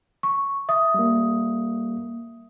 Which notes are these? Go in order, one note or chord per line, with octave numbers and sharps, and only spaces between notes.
C#6
E5 D#6
G3 A#3